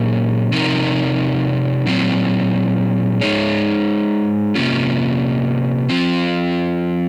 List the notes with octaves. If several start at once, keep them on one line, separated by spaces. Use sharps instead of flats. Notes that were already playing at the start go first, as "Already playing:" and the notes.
Already playing: A#2 F#3 A#3 C#4 G#4
C3 F3 C4 D#4 A#4
A#2 F#3 C4
G#3 D#4 G#4 C#5
C3 D#3 A#3 C#4 F4
F3 C4 F4